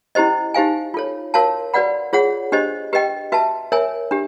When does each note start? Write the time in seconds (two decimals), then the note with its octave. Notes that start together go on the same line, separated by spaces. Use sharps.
0.15 C#4 E4 G4 C5 D#5
0.54 D#4 G4 C5 F5 G#5
0.94 F4 A4 C#5
1.34 F#4 A#4 C#5 F5 A5
1.74 F#4 B4 D5 F#5 B5
2.13 F4 G#4 C#5 F#5
2.52 D4 G4 C5 D#5
2.93 G4 B4 D#5 G5
3.32 F#4 B4 E5 A5
3.72 A#4 C#5 E5 G#5
4.11 D4 G4